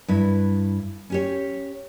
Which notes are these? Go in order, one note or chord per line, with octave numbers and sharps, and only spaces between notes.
G2 E4
C#4 G4 C#5